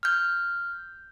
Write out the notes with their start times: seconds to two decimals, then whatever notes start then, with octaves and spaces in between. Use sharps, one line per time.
0.03 F6 G6